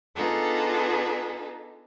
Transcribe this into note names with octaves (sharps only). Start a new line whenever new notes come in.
B3 D4 D#4 F4 G#4 A4